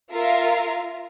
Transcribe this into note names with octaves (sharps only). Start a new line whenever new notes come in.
F4 A#4 E5 F5